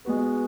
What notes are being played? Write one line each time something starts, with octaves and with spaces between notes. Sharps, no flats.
G#3 B3 F#4 B4